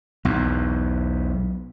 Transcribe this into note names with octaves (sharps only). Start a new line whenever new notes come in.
B1 E2